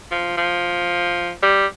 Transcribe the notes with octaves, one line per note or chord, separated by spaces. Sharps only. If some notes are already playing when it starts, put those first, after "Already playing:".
F3
F3
G3